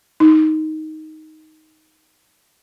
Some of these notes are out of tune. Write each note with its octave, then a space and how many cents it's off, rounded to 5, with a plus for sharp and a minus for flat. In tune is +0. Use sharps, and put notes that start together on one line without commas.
D#4 +5